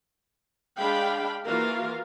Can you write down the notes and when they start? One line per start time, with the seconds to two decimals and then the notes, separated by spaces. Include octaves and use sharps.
0.79 G#3 D4 F5 G5 B5
1.47 E3 A#3 F4 F#4 A#4 F5